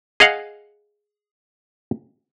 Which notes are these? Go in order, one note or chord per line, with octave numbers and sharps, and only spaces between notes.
G#4 D#5 F5 F#5